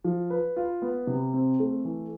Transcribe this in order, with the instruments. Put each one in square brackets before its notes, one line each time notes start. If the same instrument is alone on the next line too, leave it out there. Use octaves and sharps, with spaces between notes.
[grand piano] F3
B4
F4
B3
C3
C4
A3
E3